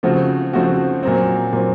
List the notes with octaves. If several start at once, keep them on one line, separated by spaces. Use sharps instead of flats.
C#3 F3 A3 C4 F#4
C#3 F3 A3 C4 F#4
A#2 F#3 C4
A#2 F#3 C4